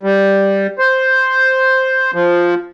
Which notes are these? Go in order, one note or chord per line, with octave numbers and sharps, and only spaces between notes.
G3
C5
F3